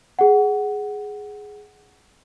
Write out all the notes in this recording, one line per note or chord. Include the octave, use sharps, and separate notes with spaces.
G#4 F#5